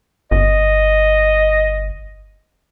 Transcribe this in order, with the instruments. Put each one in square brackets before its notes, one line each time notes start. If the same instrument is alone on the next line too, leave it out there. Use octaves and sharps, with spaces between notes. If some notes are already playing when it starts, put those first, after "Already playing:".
[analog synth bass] G1 [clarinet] D#5